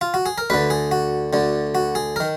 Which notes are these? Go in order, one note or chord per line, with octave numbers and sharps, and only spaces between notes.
F4
F#4
G#4
A#4
D2 D3 B4
G#4
F#4
D2 D3
F#4
G#4
D#3 A#4